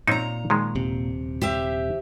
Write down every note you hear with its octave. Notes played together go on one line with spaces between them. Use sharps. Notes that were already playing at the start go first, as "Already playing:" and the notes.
A#2 C4 C#4 D#4 A#5
D#3 F3 G#3
D#1 C3
G4 C5 E5